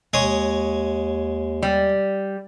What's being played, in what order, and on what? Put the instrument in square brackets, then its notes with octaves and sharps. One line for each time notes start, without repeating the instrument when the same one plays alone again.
[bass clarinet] D#2 [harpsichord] G#3 C#5 D#6
[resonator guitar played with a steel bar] G3